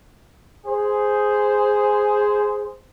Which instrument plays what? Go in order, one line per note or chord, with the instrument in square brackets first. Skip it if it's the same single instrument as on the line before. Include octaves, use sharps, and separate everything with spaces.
[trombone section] G#4 C5